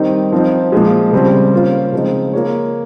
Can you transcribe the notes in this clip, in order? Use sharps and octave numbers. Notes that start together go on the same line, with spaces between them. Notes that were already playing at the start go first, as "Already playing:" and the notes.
Already playing: D#3 G3 C4 D#4
F3 C4 D#4
A#2 F3 G#3
C#3 G3 C4
A#3 C#4 F4 C5
C#3 F3 G#3 C4 D#4
A#3 F4 G#4 C#5